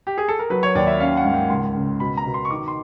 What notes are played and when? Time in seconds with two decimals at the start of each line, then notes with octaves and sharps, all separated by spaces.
0.07 G4
0.18 G#4
0.28 A4
0.39 A#4
0.50 F#3 B4
0.63 C#5
0.75 D#2 D5
0.87 E5
1.00 C#4 F5
1.17 F#5
1.25 G#2
1.34 G5
1.50 C#2 C6
1.75 C#3
2.00 B2 B5
2.17 A#5
2.26 B2
2.34 C6
2.45 C#6
2.50 D#3 D6
2.68 C6